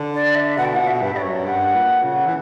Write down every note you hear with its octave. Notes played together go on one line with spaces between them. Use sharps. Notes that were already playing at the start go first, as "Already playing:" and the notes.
Already playing: D3
D5
E5
B2 F#5
G5
A#2 F#5
B2
E5
G2
G2 D5
F#2 C#5
G2 F#5
A#2
C#3
E3